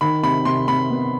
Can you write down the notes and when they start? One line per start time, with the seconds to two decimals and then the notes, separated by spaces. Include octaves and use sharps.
0.01 D#3 B5
0.23 C3 B5
0.45 C3 C6
0.68 C3 B5
0.90 B3